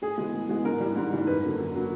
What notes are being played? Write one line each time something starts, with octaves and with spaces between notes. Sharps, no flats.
A2 G#4
E3 G#3 B3
A2
E3 G#3 B3
G#2 A#4
E3 G3
G#2
E3 G3
F#2 B4
D3 F#3 A#3
F#2
D3 F#3 A#3